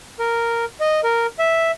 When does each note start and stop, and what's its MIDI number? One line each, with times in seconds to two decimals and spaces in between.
0.19 0.65 70
0.80 1.01 75
1.04 1.26 70
1.39 1.71 76